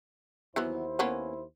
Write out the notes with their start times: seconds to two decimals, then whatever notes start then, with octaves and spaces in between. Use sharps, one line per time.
0.56 D#2 E3 F#3 B3 E4 C5
0.99 A#3 B3 C#4